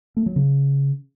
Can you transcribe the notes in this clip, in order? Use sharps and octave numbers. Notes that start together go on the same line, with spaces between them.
A3
F#3
C#3